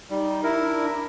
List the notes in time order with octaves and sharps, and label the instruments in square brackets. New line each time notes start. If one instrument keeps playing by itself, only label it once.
[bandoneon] G3 [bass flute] D#4
[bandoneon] E4 A#4
[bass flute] D4